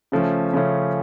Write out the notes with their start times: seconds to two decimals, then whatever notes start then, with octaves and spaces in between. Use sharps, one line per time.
0.12 C#3 F3 A3 C#4
0.53 C#3 F3 A3 C#4